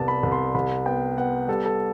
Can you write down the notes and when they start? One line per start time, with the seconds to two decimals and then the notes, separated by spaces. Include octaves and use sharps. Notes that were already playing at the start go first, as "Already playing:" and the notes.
Already playing: C2 B3 D5 A5
0.08 B5
0.23 C2
0.32 C6
0.55 C2 B5
0.86 B3 G5
1.17 B3 F#5
1.48 G3 A4
1.65 A4